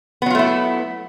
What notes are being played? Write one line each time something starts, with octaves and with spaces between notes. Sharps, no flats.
F#3 A3 B3 E4 F4